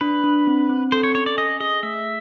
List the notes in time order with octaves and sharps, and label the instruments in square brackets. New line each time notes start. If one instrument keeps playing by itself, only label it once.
[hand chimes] D4 [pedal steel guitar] B4
[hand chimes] D4
C4
C4
[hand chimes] A4 [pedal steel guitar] C5
[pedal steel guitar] C#5
[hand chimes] C#4 [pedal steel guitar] C#5
[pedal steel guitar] D5
[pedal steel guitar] D#5 [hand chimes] G#5
[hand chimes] G#4 [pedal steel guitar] D#5
[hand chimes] A3 [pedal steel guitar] E5